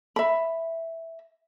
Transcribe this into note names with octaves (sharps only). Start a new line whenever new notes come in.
E5 B5